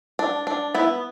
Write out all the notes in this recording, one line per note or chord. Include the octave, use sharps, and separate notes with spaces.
D4
D4
B3 E4